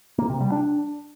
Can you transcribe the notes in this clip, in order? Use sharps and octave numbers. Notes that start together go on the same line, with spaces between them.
A#3
C3
G3
D4